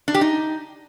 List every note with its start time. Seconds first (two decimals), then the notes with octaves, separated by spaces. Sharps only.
0.08 D4
0.14 G4
0.21 D#4